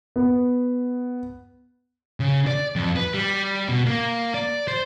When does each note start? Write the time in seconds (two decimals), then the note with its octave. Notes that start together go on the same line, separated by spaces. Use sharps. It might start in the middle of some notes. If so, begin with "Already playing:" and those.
0.16 B3
2.20 C#3
2.47 D5
2.76 F2
2.96 B4
3.14 G3
3.68 B2
3.86 A#3
4.34 D5
4.68 C5